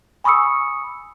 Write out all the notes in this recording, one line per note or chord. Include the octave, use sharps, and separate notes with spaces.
G#5 B5 C#6 D#6 E6 C#7